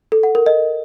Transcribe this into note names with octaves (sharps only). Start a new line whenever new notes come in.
A4
F#5
A#4
D#5